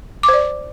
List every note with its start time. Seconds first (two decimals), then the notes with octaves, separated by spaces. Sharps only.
0.23 D6
0.28 C5
0.33 D5